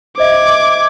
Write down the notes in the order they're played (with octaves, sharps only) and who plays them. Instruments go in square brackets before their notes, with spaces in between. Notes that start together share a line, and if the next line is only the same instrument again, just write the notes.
[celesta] C5 D#5 E5 [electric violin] D6 G#6